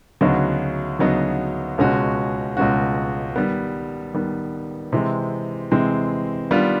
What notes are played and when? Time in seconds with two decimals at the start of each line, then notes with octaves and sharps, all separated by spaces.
0.21 D2 C#3 F#3 B3 D#4
0.99 D2 C#3 F#3 B3 D#4
1.78 C#2 B2 G#3 C#4 F#4
2.57 C#2 B2 G#3 C#4 F#4
3.36 D#3 G3 B3
4.14 D#3 G3 B3
4.93 C3 E3 G#3 C4
5.71 C3 E3 G#3 C4
6.50 D#3 G3 B3 D4 F4